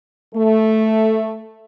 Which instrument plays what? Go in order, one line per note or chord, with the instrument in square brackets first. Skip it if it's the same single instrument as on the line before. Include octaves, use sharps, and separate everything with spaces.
[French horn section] A3